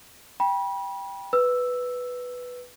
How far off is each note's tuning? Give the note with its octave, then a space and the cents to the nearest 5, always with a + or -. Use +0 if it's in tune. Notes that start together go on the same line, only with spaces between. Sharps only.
G5 +10 B5 -30
B4 +0 E6 +0